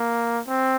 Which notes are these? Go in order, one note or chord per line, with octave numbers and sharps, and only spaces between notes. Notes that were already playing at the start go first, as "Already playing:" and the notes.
Already playing: A#3
C4